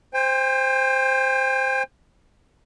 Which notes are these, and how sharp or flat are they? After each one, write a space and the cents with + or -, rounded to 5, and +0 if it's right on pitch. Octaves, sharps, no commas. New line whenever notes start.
C5 +0 G5 +40